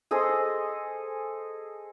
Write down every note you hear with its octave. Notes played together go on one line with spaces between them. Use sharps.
G#4 A4 C5 D#5